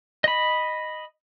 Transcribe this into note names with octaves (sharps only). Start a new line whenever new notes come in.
D#5 B5